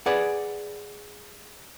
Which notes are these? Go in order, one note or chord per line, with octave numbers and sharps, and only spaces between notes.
G#4 B4 D5 F#5